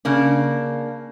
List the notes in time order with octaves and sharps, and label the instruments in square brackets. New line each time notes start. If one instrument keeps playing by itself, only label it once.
[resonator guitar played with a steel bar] C#3 A#3 D4